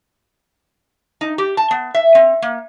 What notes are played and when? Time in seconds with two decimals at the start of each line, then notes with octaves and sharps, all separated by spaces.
1.21 D#4
1.38 G4
1.57 A5
1.71 B3
1.94 E5
2.15 C4
2.42 A#3